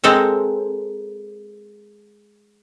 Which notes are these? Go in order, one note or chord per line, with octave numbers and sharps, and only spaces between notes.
G#3 C4 A4 A#4